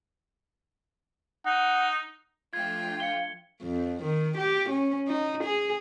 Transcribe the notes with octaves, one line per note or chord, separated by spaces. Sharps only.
D#4 F#5
F3 A3 D4 F4 G5 G#6
F5 C#7 G7
F2
D#3
G4
C#4
D#4
G#4